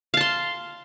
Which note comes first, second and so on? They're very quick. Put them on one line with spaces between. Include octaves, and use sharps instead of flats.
F5 A5 C6